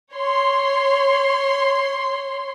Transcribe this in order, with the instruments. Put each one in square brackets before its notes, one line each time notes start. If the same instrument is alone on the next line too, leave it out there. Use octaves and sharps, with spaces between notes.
[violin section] C#5 C6